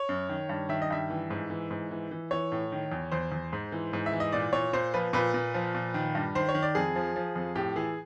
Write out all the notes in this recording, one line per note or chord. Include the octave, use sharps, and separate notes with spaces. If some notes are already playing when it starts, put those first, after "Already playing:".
Already playing: C#5
F#2
D#3
G2
D#3 E5
D#5
G2 E5
E3
G#2
E3
G#2
E3
E3
E3 C#5
A2
D#3
E2
E2 C5
E2
G#2
E3
G#2
E5
E3
D#5
A#2 D5
A#2 C#5
A#2 C5
F3 B4
A#2 B4
A#2
F3
A#2
D#3
G2
D#3 C5
C#5
D#3
D5
F2 G#4
F3
F3
F2
A2 G4
E3 G#4